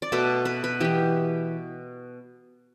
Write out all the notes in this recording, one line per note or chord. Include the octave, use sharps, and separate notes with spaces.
D5
B2 A3 B4
B4
B4
E3 B3 G4